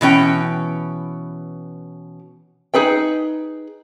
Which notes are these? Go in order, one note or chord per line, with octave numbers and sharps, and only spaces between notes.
B2 E3 C#4 G5
D#4 G#4 B4 G5